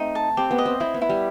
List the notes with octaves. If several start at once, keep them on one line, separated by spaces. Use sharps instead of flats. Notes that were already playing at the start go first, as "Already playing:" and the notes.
Already playing: A3 C4 D#4
A5
C4 G4
B3
D#5
C4
C4 E4
B3
E4
G3